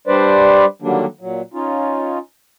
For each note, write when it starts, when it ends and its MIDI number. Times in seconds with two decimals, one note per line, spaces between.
0.07 0.65 55
0.07 0.65 62
0.07 0.65 71
0.07 0.65 72
0.07 0.65 74
0.82 1.06 50
0.82 1.06 51
0.82 1.06 54
0.82 1.06 55
0.82 1.06 58
0.82 1.06 62
1.21 1.41 46
1.21 1.41 54
1.54 2.18 61
1.54 2.18 63
1.54 2.18 65